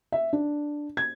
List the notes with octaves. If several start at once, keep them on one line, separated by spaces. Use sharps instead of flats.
E5
D4
G#6